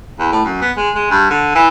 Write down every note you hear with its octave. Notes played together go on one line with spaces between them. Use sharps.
E2
A2
F#2
B3
G#3
G#3
G2
D3
E3